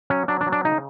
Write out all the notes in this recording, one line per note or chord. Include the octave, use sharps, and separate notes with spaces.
F#3 C#4
F#3 D4
D4
F#3
D4
C#3 D#4